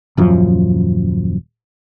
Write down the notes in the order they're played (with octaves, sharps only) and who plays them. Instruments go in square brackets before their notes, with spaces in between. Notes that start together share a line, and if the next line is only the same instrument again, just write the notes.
[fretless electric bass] D#1 F#2 F3